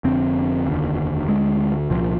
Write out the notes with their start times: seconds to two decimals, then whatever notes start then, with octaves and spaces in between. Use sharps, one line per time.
0.04 F1 F2 D3 C4
0.66 F1 D#2 D3
1.28 D2 D3 G#3
1.90 C2 A#2 F3